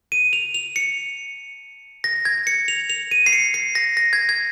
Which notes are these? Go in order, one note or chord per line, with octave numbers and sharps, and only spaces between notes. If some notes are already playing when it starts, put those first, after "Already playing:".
D#7
F7
F7
C#7
A#6
G#6
C#7
F7
F7
D#7
C7
C#7
C7
A#6
A#6
G#6
G#6